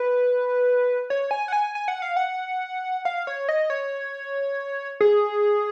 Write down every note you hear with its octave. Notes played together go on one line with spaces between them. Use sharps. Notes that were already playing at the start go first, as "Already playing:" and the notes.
Already playing: B4
C#5
G#5
F#5
G#5
G#5
F#5
F5
F#5
F5
C#5
D#5
C#5
G#4